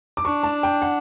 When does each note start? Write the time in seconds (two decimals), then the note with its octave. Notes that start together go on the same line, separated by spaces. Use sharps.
0.17 D6
0.25 D4 C#6
0.43 A5
0.63 G5
0.82 F#5